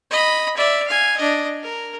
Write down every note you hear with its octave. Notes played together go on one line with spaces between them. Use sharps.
D#5 B5
D5 E5
F5 G#5
D4 D#5
A#4